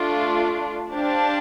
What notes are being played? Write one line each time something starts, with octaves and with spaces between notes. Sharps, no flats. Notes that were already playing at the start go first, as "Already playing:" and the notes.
Already playing: A3 D4 F4
D4 G4 C5 F5 A5